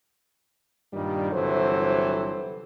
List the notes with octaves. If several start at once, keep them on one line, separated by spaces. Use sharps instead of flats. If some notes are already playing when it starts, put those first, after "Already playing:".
G2 A#2 D#3 G3
G1 C3 E3 F#3 A4 C5